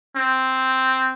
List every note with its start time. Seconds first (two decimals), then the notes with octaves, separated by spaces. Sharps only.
0.16 C4